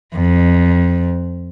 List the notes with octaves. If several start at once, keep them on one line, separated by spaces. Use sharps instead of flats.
F2